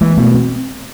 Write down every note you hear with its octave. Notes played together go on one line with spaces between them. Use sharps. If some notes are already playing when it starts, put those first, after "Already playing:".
E3 G#3 A#3
B2 A3 B3
C4